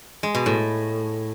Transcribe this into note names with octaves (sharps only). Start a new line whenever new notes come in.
G#3
B2
A2